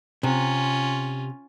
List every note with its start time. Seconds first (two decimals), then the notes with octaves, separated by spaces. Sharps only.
0.23 C3 C#4 F4